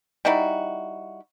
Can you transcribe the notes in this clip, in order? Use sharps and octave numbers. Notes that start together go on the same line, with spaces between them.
G3 D#4 E4 F#4